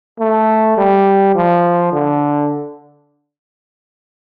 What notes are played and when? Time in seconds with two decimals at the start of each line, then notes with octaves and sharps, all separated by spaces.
0.20 A3
0.77 G3
1.35 F3
1.93 D3